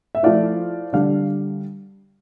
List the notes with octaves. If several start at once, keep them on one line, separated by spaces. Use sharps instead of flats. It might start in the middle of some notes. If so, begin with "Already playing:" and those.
E5
F3 A3 E4 D5 F5
D3 G3 D4 D5 F5